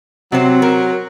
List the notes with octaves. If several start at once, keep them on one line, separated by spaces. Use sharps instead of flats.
C3 F#3 C4 C5
C4 A#4